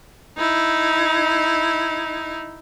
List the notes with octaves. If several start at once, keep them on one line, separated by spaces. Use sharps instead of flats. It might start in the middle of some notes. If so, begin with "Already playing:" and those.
D#4 E4